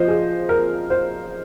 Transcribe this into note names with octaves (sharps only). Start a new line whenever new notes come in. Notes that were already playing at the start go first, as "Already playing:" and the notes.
Already playing: F3 C5 D#5
G#4
A#4
C5